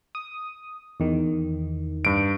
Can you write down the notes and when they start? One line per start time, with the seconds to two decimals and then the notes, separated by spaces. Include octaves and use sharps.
0.15 D#6
1.00 E2 D#3
2.05 G2 D7